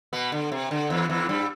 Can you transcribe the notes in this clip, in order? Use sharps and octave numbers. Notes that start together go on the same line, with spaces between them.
B2 B3
D3
C3
D3
E2 E3
E2 E3
G2 G3